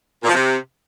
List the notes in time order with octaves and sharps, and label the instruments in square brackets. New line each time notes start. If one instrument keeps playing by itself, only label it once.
[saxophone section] A#2
F3
C3